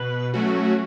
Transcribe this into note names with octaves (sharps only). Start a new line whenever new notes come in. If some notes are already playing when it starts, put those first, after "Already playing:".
Already playing: B2 B4
F#3 A3 C#4 F#4